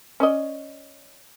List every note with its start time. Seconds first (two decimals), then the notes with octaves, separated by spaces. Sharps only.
0.20 C#4 D5 D#5